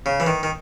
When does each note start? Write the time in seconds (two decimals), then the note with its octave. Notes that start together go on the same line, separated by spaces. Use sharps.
0.06 C#3
0.20 E3
0.27 D#3
0.43 D#3